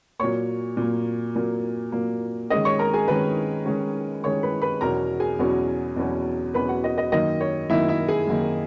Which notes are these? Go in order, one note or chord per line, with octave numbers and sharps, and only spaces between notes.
A#2 F#3 A#3 C#5 C#6
A#2 F#3 A#3
A#2 F#3 A#3
A#2 F#3 A#3
D#3 G#3 C#4 D#5 D#6
C#5 C#6
A#4 A#5
G#4 G#5
D#3 G#3 C#4 B4 B5
D#3 G#3 C#4
D#3 G#3 C#4 C#5 C#6
B4 B5
B4 B5
E2 B2 F#3 C#4 A#4 A#5
G#4 G#5
E2 B2 F#3 C#4
E2 B2 F#3 C#4
E2 B2 F#3 C#4 B4 B5
F#4 F#5
D#5
D#5
F#2 D#3 A#3 D#4 D#5
C#5
F#2 D#3 A#3 D#4 E4 E5
E4 E5
G#4 G#5
F#2 D#3 A#3 D#4